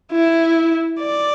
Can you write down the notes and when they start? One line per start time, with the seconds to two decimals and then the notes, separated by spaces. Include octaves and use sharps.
0.12 E4
1.01 D5